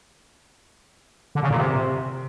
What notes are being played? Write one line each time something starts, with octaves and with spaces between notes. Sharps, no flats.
D3
C#3
A#2
C3